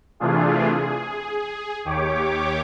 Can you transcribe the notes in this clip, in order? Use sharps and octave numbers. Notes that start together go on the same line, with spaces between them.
C3 E3 A3 D4 F4 G#4
G#4
D#2 G4 C#5 D6